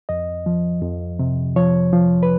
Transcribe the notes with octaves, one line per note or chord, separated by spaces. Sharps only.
F2 D#5
F3
F2
C3
F3 C#5
F3
B4